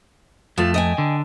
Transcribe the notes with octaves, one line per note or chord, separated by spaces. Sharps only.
F2 F3 A3 A5
D#5 G5 G#5
D3